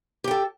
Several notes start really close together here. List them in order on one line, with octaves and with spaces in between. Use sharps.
G4 G5 A4